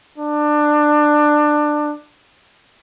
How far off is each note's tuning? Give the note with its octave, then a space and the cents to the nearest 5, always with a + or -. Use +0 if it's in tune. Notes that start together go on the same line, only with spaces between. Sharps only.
D4 +20